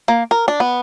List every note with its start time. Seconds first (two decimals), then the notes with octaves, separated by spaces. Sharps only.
0.08 A#3
0.31 A#4
0.48 D4
0.60 B3